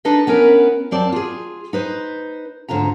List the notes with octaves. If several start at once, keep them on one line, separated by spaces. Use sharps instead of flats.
D4 D#4 A4 B4 D#5
B3 C#4 E4 A#4
F#2 C4 D5 A5
F4 G#4
D#4 B4 C5
D2 G#2 D3 F4 A#5